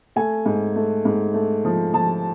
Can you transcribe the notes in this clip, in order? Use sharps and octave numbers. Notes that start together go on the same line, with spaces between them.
A3 G#5
G#2
A3
G#2
A3
F3
F3 A5